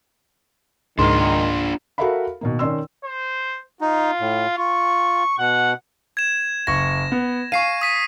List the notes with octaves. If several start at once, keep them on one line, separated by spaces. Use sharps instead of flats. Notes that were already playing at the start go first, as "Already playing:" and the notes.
C#2 G#2 D#3 G#3 D4 F4 C6
F#4 A4 A#4 E5 F5 B5
B2 D#3 A#3
D#3 C#4 D5 C6 E6
C5
D#4 F4
A2
F4 C#6
B2 F#5
G#6 E7
F#1 C#6 A#6
B3
F5 G#5 C#6 C7 D#7
D#6 B6 D#7